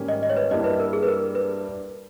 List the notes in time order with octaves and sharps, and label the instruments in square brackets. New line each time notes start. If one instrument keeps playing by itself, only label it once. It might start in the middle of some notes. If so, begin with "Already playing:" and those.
Already playing: [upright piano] G#2 D#3 G3 A#3 C#4
[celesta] D#5
D#5
C#5
B4
[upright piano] G2 G3 A#3 E4 [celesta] D#5
[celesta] B4
A#4
G#4
B4
A#4
B4